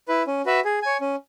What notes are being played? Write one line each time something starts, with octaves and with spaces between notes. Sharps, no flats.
E4 B4
C#4
F#4 B4 E5
G#4
C#5 G#5
C#4